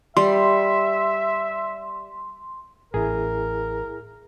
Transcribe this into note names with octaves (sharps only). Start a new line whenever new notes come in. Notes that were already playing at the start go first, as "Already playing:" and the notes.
G3 E5 C6
A1 E4 G#4 A#4